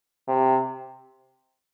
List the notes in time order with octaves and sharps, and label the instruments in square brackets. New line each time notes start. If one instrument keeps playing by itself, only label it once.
[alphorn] C3